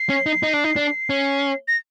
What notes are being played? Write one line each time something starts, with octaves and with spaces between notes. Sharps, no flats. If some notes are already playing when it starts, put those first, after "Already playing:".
Already playing: C7
C#4
D#4
D#4
D4
D#4
D4
C#4
A#6